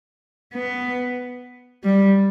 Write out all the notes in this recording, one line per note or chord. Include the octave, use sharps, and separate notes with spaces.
B3
G3